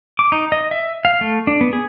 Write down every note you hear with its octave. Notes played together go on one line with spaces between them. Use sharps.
D6
D#4
D#5
E5
F5
A3
D4
B3
G#4